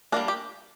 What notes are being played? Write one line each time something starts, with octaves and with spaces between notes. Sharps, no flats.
G3 A#3 D4 A#4
G4